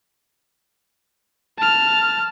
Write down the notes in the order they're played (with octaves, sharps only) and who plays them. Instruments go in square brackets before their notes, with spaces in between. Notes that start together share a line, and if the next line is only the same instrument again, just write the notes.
[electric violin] A5 F6